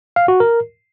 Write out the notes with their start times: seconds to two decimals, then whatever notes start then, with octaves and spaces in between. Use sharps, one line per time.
0.16 F5
0.28 F#4
0.40 A#4